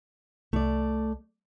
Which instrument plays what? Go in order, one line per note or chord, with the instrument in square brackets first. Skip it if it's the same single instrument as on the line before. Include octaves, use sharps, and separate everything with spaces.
[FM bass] C2 [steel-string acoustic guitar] A3 D5